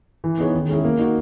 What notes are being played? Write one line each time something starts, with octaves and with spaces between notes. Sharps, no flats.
E3
B3 D#4 G#4 C#5
D#3
G#3 C#4 E4 G#4
A#3
D#4 F#4